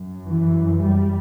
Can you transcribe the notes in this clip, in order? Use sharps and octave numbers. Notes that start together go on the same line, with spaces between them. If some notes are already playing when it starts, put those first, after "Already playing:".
Already playing: F#2
E3
G3